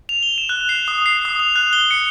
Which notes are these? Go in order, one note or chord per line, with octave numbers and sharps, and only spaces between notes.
F7
G7
E7
F#6
C7
D#6
C7
D#6
F7
F#6
G7
C#7